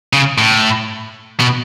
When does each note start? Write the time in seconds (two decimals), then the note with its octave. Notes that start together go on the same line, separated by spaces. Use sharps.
0.13 C#3
0.38 A2
1.40 B2